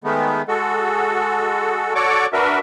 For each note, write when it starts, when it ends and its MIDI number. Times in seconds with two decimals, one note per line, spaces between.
0.04 0.42 51
0.04 0.42 56
0.04 0.42 57
0.04 0.42 59
0.48 1.95 56
0.48 1.95 66
0.48 1.95 69
1.95 2.26 66
1.95 2.26 69
1.95 2.26 73
1.95 2.26 74
1.95 2.26 85
1.95 2.26 86
2.33 2.59 62
2.33 2.59 66
2.33 2.59 70
2.33 2.59 71
2.33 2.59 76